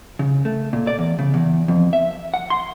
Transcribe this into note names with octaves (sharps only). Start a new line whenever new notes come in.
C#3
A3
A#2
D5
E2
C#3
E2
F2
E5
F#5
C6